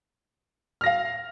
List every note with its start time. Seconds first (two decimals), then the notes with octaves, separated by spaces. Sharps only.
0.81 F6
0.84 A#6
0.86 F5